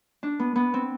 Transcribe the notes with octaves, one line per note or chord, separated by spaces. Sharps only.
D4
B3
B3
C4